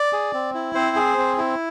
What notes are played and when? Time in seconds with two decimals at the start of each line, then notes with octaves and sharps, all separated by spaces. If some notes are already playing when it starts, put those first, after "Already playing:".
Already playing: D5
0.13 G#4
0.34 C4
0.54 E4
0.75 C4 C5
0.96 G#4
1.18 C4
1.38 E4